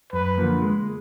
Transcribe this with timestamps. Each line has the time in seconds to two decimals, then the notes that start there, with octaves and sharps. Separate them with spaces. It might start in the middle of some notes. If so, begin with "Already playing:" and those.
0.13 F#2 B4
0.38 D3 F3 A#3
0.62 G#3